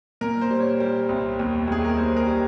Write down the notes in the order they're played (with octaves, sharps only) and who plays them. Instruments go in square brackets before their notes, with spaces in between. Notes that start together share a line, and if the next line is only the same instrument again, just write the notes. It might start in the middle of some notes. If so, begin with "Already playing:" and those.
[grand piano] A#2 A#4
C5
G3
C#5
G3
C2
D#2
D#2 G#4
A#4
D#2 C5
A#4
G3